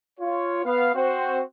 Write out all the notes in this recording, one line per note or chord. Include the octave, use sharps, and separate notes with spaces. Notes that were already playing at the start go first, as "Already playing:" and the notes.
F4 C#5
B3 F5
C4 F#4 C5